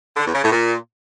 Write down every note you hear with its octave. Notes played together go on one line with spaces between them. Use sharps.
D3
E2
C#3
A2
A#2